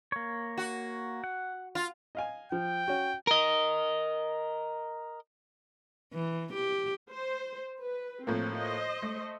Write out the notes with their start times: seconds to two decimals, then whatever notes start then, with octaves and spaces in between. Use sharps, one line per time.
0.12 A#3 C#5
0.58 F#4
1.24 F#5
1.75 F4
2.15 D#5 F5 G#5
2.52 F3 G5
2.88 C#4 F#4
3.27 A#4 D#5
6.14 E3
6.54 G4
7.11 C5
7.82 B4
8.27 A2 F3 A#3 C4
8.59 C5 D#5
9.02 A3